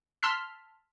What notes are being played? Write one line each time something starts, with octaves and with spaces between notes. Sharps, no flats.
A5 C6 E6 F6 B6